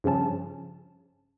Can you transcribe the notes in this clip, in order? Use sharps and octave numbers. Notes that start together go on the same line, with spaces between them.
G2 C#3 F3 C#4 A5